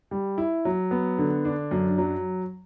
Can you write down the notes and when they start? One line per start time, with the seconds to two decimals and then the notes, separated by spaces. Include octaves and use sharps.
0.11 G3
0.38 E4
0.65 F#3
0.91 B3
1.18 D3
1.45 D4
1.71 F#2
1.98 F#3